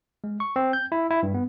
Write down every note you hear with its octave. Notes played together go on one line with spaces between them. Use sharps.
G#3
C#6
C4
G6
E4
E4
G2
B3